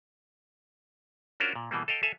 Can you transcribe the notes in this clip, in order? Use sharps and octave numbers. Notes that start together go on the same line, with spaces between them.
C#4 D4 F4 F#4 A#4 C5
A#2
B2 E3 G3 A#3
A4 D#5 F5 G5
A4 E5 F5 G#5